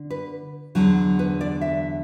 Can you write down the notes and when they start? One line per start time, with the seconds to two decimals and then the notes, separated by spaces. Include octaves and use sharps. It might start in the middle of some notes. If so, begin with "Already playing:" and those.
Already playing: D3
0.10 B4
0.75 E2 D3 F#3
1.19 B4
1.41 D5
1.61 E5